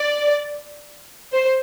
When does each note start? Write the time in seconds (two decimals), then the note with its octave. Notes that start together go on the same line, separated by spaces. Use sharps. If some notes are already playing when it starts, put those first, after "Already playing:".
Already playing: D5
1.33 C5